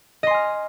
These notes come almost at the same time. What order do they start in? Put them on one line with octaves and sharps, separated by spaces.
D#5 C6 G#5 F6